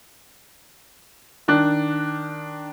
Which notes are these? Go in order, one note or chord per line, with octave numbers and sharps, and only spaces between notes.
D#3 D4 F#6